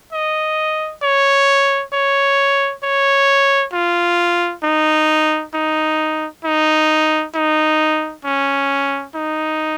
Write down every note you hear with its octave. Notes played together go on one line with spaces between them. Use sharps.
D#5
C#5
C#5
C#5
F4
D#4
D#4
D#4
D#4
C#4
D#4